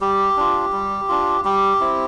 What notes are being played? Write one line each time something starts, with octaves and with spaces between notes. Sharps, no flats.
G3 G4
D4 F4
G3
D4 F4
G3 G4
C4 E4